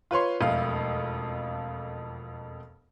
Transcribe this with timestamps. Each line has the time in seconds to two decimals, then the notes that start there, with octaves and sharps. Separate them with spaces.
0.11 F4 B4 C#5 C6
0.41 E1 F2 A3 F5